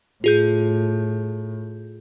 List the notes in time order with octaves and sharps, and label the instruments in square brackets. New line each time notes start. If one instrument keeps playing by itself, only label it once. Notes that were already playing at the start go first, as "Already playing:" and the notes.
[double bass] A2 [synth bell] F4 G#4 G6